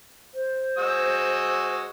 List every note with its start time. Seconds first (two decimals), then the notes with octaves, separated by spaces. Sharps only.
0.35 C5
0.78 G#3 F#4 E6